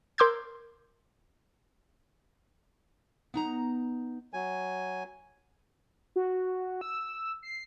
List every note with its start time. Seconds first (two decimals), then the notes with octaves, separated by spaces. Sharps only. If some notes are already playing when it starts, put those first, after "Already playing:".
0.18 A#4 C6 D6 E6 G6 G#6
3.34 B3 D#4 A#5
4.33 F#3 G#5
6.16 F#4
6.81 E6
7.43 C7